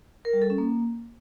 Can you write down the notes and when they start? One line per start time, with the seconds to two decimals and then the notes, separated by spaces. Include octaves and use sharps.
0.25 A#4
0.33 G3
0.42 A4
0.50 C#4
0.58 A#3